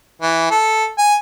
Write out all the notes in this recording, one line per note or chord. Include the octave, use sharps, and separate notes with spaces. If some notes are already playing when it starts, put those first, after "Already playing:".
E3
A4
G#5